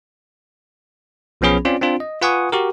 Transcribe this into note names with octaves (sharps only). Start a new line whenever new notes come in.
B1 F3 B3 C#4 G#4 B5
C4 C#4 F4 D5
C4 D4 F4
D#5
F4 B4 F#5 G#5 C#6 D#6
F#4 G4 A#4